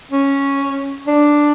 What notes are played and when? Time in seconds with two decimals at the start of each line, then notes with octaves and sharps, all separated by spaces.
0.11 C#4
1.07 D4